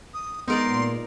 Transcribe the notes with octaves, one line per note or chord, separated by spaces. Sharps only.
D#6
G#3 B3 D#4 A#4 D5 C6
A#2